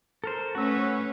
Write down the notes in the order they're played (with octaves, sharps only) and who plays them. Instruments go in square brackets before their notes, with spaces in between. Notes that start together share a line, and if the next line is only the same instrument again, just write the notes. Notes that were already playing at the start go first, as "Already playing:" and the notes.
[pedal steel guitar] A4 A#4 C5
[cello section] A3 C#4 B4 [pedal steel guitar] F#4 E6